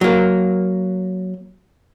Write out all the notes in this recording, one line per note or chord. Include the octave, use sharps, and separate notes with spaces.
F#3 A#3